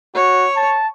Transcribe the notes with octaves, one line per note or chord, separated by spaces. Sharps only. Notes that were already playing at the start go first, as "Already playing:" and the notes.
F#4 C#5
A5